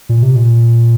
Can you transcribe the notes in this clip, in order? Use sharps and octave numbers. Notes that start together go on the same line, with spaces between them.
A#2
C3
A#2